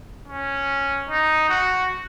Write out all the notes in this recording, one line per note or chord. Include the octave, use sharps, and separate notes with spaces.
C#4
D#4
F#4